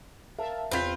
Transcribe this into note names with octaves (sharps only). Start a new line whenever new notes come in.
A#4 E5 F5 A5
E2 C4 F4 B4 G6 B6